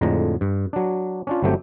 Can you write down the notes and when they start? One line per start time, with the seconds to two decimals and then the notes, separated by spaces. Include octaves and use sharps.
0.01 F2 A2 D3 G#3 A#5
0.41 G2
0.73 F#3 D4
1.27 C#4 D4 F4
1.42 G1 F#3 A3 C4 G4 G5